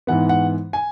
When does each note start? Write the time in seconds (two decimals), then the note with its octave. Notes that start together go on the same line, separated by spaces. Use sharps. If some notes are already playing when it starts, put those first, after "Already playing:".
0.07 G#2 E3 B3 F#5
0.29 F#5
0.73 G#5